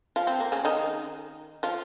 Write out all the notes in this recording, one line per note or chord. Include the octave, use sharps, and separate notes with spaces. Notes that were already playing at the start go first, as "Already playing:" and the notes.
F3 F4
C4
A#3
C#3 C#4
D#3 D#4
F3 F4